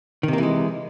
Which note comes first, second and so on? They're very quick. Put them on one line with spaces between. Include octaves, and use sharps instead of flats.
D#3 C3 A#3 E3 G#3